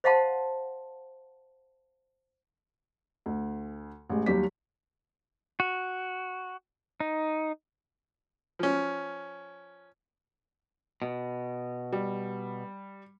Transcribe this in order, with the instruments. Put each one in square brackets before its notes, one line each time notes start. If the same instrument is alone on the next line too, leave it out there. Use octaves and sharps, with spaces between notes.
[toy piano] C5 D#5 F5 F#5 A5 C6
[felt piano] D2
A1 G#3
D#2 F#3 G3 G4 B6
[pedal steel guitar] F#4
D#4
[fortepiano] F3 C#4
[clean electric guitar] B2
[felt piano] G3